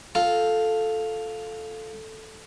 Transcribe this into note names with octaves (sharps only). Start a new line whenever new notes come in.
F4 A4